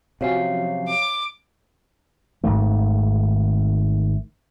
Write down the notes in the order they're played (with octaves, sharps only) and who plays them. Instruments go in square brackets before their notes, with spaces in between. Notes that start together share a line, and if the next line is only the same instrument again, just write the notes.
[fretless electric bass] C3 [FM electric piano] F3 F#3 C#4 [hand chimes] C#5 F5 C7
[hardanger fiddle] D6
[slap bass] G#1 G#2 D#3 A3